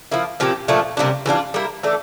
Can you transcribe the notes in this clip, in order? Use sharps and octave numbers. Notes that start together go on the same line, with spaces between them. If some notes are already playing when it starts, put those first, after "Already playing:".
F3 A#3 E4
A#2 F3 C4 G4
A#2 F3 A3 D4
C3 G3 A#3 D4
E3 G3 D4 F4
G3 A#3 E4 A#4
E3 A3 D4 A4